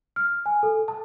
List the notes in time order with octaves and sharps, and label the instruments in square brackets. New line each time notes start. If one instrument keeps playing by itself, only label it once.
[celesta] F6
G#5
A4
A5